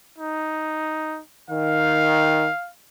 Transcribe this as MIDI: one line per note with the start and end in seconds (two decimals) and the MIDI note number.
0.19 1.20 63
1.50 2.47 51
1.50 2.70 77